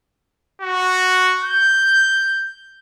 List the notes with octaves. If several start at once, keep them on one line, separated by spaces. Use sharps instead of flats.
F#4
G6